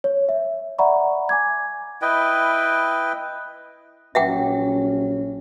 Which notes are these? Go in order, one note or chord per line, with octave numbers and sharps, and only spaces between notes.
C#5
E5
D5 E5 F#5 A#5 B5 C#6
G#5 D6 G#6
E4 B4 D#5 G5
A#1 F#3 C#4 E5 F#5 G5